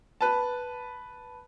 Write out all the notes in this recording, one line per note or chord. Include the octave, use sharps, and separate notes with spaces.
B4 A5